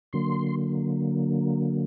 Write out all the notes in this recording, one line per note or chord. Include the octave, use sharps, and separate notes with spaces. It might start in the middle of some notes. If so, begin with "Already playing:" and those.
D3 F#3 A#3 C6